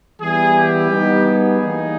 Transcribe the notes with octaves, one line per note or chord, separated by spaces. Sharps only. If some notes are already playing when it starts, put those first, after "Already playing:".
E3 G3 B3 E4 G#4
G4
G3 B3 D#4
G#4
E3 G3 A#3 D#4